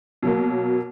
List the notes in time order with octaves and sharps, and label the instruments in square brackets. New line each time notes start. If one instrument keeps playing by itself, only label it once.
[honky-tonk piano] B2 F#3 A#3